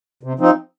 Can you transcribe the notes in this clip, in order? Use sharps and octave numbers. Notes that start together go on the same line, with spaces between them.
C3
F3 C4 D#4